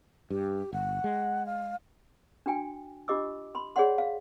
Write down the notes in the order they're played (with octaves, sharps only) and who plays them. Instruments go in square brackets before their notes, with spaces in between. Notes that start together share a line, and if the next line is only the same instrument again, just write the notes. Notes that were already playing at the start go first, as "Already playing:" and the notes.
[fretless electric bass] G2 [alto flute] G4
[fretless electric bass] G1 [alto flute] F#5
[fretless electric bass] G#3
[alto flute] F5
[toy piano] D4 F#4 G5 G#5
D4 F4 G4 D#5 D6 E6
B5 C6
G#4 C#5 D5 E5 F#5 C6
F5